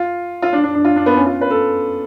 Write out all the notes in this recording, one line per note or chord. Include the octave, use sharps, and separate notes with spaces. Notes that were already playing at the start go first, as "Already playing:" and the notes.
Already playing: F4
F4
D4
D4
D4
F4
D4
B3
C#4
F4
B4
A4